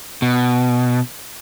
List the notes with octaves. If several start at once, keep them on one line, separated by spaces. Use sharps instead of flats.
B2